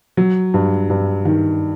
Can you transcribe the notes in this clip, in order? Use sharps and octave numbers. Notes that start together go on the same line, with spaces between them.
F#3
G2
G2
D#3